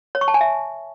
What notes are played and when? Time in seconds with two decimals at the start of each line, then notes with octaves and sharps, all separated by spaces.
0.15 C#5
0.21 C#6
0.28 A5
0.34 G#5
0.41 E5